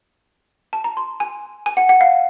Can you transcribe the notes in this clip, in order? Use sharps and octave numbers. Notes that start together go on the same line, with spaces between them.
A5
A#5
C6
G#5
G#5
F#5
F#5
F5